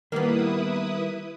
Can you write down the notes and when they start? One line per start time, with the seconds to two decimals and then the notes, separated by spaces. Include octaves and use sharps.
0.12 D#3 G3 A#3 B3 E4 B4 D#6